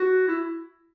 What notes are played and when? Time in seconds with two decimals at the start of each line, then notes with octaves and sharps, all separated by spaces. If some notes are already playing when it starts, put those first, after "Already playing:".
Already playing: F#4
0.28 E4